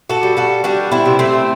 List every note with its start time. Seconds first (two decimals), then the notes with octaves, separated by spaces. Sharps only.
0.09 F#4 A4
0.23 G3
0.37 F#4 A4
0.64 G3 D4 F#4
0.92 C4 E4
1.06 C3
1.19 A3 C4